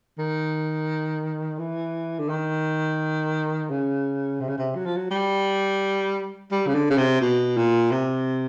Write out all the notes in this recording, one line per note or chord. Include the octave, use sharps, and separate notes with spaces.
D#3
E3
D3
D#3
C#3
C3
C#3
C3
F#3
F3
F#3
G3
G3
C#3
D3
C#3
C3
B2
A#2
C3